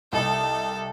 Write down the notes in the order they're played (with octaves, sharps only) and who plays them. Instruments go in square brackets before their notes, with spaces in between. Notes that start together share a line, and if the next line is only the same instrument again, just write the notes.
[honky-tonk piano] C2 D#5 A5 [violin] A4